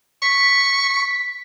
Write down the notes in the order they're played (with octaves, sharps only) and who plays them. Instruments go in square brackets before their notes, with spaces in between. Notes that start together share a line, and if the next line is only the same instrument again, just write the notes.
[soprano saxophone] C#6 [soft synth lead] B6